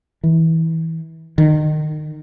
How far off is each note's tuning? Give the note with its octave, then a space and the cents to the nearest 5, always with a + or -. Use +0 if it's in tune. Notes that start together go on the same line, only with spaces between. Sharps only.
E3 -25
D#3 -25